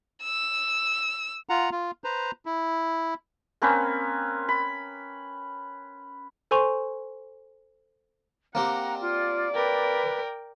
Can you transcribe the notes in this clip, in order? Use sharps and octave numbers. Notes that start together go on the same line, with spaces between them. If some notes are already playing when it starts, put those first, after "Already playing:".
E6
F4 F#5 A#5
F4
B4 C5 A#5
E4
A#3 C4 C#4 B4
B5
A4 C5 G#5 C6 C#6 F7
A#3 C4 G4 F#5 A#5
F4 D5
A#4 B4 G5